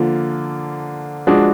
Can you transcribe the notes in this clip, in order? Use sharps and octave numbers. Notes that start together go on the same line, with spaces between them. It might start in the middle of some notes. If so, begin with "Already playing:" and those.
Already playing: D3 F3 A#3 F4
F3 G#3 D4 F#4